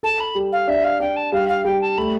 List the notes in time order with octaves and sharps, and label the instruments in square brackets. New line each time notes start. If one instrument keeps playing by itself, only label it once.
[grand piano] A4 [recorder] A5
[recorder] B5
[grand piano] G3
[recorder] F5
[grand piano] D4 [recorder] E5
[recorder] F5
[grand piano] D4 [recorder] G5
[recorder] A5
[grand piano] G3 [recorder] F5
[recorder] F5
[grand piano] G3 [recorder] G5
[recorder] A5
[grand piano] A3 [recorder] B5